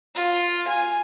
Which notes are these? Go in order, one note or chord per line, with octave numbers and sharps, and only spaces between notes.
F4
G#5